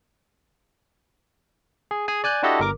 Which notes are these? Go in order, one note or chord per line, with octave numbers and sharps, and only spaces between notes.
G#4
G#4 G#5
D5 G#5 F#6 G6
D4 E4 F#4 G4 A4 D#5
G1 A#4 D6